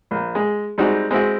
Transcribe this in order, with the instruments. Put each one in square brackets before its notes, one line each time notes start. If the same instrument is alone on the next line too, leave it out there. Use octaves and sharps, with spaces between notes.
[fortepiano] A#1
G#3
G3 G#3 C4 D#4 F#4
G#3 C4 E4 F#4